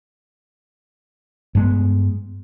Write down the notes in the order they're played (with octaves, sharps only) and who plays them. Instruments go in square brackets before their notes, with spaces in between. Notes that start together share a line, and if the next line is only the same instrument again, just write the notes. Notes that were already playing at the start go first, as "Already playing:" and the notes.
[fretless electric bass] G2 G#3 B3